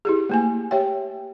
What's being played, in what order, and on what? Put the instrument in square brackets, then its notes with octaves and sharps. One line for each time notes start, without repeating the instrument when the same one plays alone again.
[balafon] E4 G4 G#4
A3 A#3 G#5
G4 C#5 E5 G5